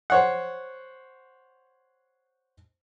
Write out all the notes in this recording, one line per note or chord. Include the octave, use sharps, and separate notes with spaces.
C5 C#5 F#5